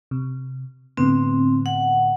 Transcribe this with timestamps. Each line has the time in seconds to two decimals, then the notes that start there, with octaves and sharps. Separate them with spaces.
0.11 C3
0.97 A2 D3 B3 C4
1.66 F#5